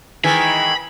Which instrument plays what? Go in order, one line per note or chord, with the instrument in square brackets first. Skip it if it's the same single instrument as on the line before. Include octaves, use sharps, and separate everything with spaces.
[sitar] D#3 E3 G#3 [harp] G#5 [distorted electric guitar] B5